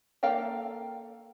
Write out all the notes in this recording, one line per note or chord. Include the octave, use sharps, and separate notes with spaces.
A#3 A4 F5 G5 A#5